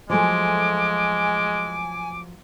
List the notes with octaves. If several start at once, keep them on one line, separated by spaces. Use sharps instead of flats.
F3 F#3 G#3 A3 G#5 D6